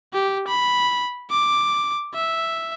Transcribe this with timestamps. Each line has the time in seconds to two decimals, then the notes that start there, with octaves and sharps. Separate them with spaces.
0.13 G4
0.48 B5
1.31 D6
2.15 E5